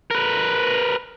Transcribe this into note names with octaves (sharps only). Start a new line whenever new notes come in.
A#4 B4